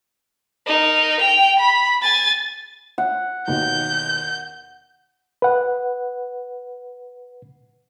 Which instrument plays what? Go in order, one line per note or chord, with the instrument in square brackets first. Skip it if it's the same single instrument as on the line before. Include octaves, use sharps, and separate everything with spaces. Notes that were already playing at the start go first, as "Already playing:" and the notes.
[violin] D#4 A#4
G5 F7
B5
G#5 A6
[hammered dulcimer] F#5
[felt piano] D#2 B2 D#3 [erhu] G6
[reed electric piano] B4 F#5